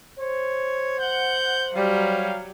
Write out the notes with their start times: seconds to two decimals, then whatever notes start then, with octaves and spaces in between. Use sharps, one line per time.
0.19 C5 C#5
1.00 F#5 G6
1.76 F#3 G3 F5